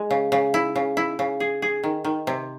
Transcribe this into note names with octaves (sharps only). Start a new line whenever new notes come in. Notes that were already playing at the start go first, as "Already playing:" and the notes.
Already playing: G#3
C#3
C#3
E4
C#3
E4
C#3
G#4
G#4
D#3
D#3
C3